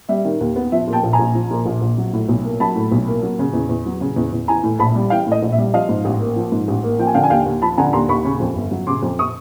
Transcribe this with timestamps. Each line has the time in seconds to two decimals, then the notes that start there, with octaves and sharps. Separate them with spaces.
0.09 G3 E5
0.25 D#3
0.40 D#2
0.56 B3
0.72 F3 E5
0.87 A#2
0.93 G5 A5
1.03 A#1
1.13 G#5 A#5
1.20 A#1
1.35 F3
1.51 A#2
1.66 A#1
1.81 A#1
1.98 F#3
2.13 A2
2.29 B1
2.44 A#3
2.60 F#3 A5 B5
2.76 A2
2.92 B1
3.07 A#3
3.23 F#3
3.39 C#3
3.54 E2
3.69 E2
3.86 F#3
4.01 C#3
4.16 E2
4.32 E2
4.48 E3 G#5 A#5
4.63 A2
4.79 A#1 A5 B5
4.96 G3
5.10 E3 F5 G5
5.27 A2 D#5
5.42 A#1
5.52 E5
5.58 G3
5.73 F3 D#5 F5
5.89 G#2
6.05 A1
6.20 A#3
6.36 F3
6.52 G#2
6.68 A1
6.83 A#3
6.99 F3 G5
7.07 G#5
7.14 D3 F5 G5
7.24 G#5
7.30 D#2 F5 G5
7.46 D#2
7.62 F3 A5 B5
7.78 D3 G#5 A#5
7.93 D#2 A#5 C6
8.09 D#2 B5 C#6
8.25 C#3
8.40 F2
8.56 G1
8.71 F#3
8.87 C#3 C6 D6
9.03 F2
9.19 C#6 D#6